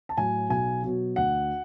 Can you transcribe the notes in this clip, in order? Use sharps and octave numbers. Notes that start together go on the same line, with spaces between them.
A5
A2 F#3 G#5
B1 G#5
B2 F#3
D2 F#5